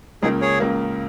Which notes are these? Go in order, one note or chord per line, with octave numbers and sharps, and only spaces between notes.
C#2 C#3 A#3 D#4 G#4
G#4 C#5
C#2 C#3 A#3